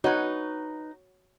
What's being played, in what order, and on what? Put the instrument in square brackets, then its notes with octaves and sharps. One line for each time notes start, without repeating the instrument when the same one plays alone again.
[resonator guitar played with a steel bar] D#4 B4 [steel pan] F#4 C#5